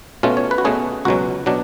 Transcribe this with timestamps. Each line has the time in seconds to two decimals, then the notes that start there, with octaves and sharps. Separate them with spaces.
0.23 B2 A3 C#4 F4
0.37 C#5
0.51 B4
0.58 F#4
0.65 B2 A3 C#4 G#4
1.05 C#2 B2 F#3 F#4
1.46 B2 F#3 D4